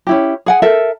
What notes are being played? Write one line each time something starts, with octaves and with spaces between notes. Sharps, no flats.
C#4 E4 G4
G#4 F#5 G#5
A4 A#4 E5